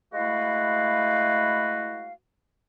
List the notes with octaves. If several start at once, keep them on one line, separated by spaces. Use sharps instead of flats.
G#3 A3 E4 F#4 B4 F5